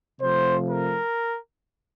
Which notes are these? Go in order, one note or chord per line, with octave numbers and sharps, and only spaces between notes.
C3 F3 A3 C5
A#4